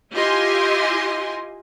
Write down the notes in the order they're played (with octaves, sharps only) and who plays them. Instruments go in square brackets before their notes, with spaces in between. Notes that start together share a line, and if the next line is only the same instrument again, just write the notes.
[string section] E4 F4 G4 D#5 G#5 C6